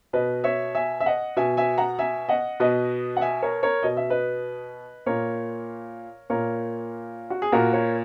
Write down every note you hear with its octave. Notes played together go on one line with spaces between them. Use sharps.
B2 B4 D#5
C#5 E5
E5 G#5
E5
D#5 F#5
B2 E5 G#5
E5 G#5
F#5 A#5
E5 G#5
D#5 F#5
B2 B4 D#5
F#5
E5 G#5
A#4 C#5
A#4 C#5
B2 D#5
E5
B4 D#5
A#2 A#4 C#5
A#2 A#4 C#5
F#4
G#4
A#2 F#4 A#4
A#4 C#5